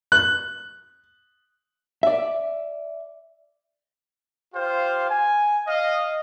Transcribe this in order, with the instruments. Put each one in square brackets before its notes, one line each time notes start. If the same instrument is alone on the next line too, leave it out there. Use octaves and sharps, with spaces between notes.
[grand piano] F#6
[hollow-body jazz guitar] D5 E5
[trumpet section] F4 G4 C5 F5
G#5
D#5 F5